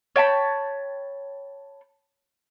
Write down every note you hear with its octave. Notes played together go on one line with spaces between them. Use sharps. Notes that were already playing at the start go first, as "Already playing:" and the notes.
C#5 G5 A5 B5